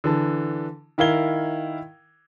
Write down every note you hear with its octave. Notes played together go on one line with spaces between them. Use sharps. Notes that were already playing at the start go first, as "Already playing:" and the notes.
D3 E3 A5
D#3 E4 A#4 F5 G#6 G7